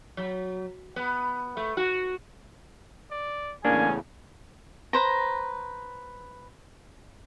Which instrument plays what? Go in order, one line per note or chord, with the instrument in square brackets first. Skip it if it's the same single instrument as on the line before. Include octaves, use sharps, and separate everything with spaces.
[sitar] F#3
B3
A3
F#4
[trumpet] D5
[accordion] E2 A2 C#3 [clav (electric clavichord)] A#3 D4 [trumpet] C#4 [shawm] G#5
[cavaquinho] B4 C5 A#5